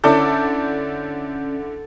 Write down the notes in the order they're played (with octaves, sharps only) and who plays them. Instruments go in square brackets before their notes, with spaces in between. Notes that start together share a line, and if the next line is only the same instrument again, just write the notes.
[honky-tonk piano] D3 E4 D6 [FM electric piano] C#4 D5 G6 [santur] A4